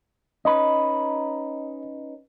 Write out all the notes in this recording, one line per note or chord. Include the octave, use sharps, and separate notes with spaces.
C#4 D#4 B4 D#5